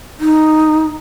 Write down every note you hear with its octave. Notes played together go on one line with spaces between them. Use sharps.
D#4